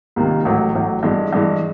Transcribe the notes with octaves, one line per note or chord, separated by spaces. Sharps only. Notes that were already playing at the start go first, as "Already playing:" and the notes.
C#2 C3 D#3 G3 A#3
A1 A2 F#3
A1 A2 F#3
G2 E3 G#3
G2 E3 G#3